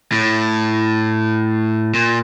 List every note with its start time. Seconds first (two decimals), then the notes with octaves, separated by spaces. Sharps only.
0.12 A2
1.94 A#2